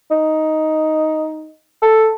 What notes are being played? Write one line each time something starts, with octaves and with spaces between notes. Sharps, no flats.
D#4
A4